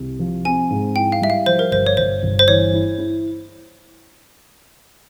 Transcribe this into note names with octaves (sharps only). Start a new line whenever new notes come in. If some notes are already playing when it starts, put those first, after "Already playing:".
Already playing: C2
F3
C4 G#5
G#2
E4 G5
F5
G3 E5
F5
F3 C5
A#4
G1 C5
C#5
G1 C5
G1
C5
E3 C#5
E4
E4